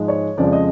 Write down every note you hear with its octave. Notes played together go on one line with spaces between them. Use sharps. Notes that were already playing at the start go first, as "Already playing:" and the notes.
Already playing: G#2 F3 G#3
C#5
F2 C#3 F3 G#3 D5
D#5